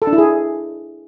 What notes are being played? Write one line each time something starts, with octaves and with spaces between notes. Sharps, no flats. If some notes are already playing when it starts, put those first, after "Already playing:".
A4
D4
E4
G#4